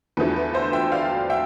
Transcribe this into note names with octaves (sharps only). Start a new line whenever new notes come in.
E2 D3 F3 A3 B4
B4
C5 E5
E5 G5
D5 F5
E5 G5